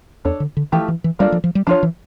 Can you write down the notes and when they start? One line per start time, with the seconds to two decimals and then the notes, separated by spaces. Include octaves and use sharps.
0.25 E2 D4 A4 C#5
0.40 D3
0.57 D3
0.72 E3 F3 A3 E4 G4
0.88 E3
1.04 E3
1.19 G3 A#3 D4 F4 A4 D5
1.32 F3
1.44 F3
1.55 G3
1.67 F3 D4 F4 C#5
1.83 E3